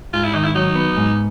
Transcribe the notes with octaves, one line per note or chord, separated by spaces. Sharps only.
G#2 F4
E4
D#3 D#4
E4
F#3 D#4
B3
G#2